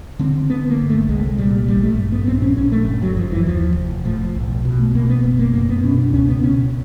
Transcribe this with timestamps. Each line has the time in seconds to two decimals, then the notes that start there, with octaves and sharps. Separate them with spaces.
0.19 D3 C4
0.50 D3 B3
0.70 A#3
0.79 G1
0.89 A3
1.09 C2 G#3
1.38 A#2 G3
1.68 A1 G3
1.83 A3
1.97 G2
2.12 B3
2.27 A#1 C4
2.42 C#4
2.57 A#1 C#4
2.72 A3
2.87 G1
3.02 F#3
3.17 F#2 F3
3.32 E3
3.46 D#2 F3
3.76 F1
4.05 A2 F3
4.35 B1
4.65 B2
4.79 A3
4.95 B2 A#3
5.09 B3
5.24 F#1 B3
5.39 A#3
5.54 F#2 A#3
5.69 B3
5.83 B2 C#4
5.98 D4
6.13 C#2 C#4
6.29 B3
6.43 B2 C#4